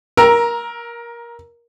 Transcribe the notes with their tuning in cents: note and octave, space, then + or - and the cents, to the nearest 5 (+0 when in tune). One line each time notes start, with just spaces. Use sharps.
A#4 +15 A#5 +0 E6 +10